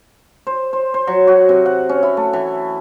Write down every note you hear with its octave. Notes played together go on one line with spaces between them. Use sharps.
C5
C5
C5
F#3
F#4
C3
F#5
C#4
E4
A3
E3